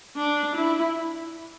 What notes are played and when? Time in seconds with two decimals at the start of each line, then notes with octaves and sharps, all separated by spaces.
0.16 D4
0.55 E4